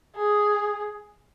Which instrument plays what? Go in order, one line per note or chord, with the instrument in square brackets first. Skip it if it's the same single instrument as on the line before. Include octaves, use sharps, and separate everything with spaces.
[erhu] G#4